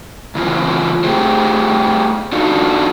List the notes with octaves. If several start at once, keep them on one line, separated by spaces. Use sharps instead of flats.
C#3 E3 C4 F4
A3 C4 G4 G#4 C5
D4 D#4 F4 F#4 A4